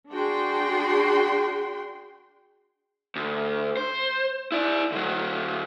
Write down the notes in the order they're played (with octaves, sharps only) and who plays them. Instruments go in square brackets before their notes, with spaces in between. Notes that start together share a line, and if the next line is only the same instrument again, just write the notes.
[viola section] D4 F#4 G#4 G5 C6
[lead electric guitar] D2
C5
E4 D5
D3 F#3